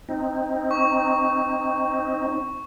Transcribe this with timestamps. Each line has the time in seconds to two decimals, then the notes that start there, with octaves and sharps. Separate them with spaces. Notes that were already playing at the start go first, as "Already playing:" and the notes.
0.09 C4 D#4
0.71 C#6